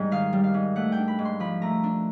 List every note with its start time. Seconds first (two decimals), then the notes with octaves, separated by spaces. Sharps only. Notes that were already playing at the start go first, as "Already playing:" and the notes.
Already playing: G#2 G3
0.11 D#3 F5
0.33 G3
0.44 F5
0.54 G#2
0.76 A3 F#5
0.92 G5
0.97 D4
1.08 B5
1.19 G#2
1.25 C6
1.40 F3 B5
1.62 A3 A#5
1.83 D4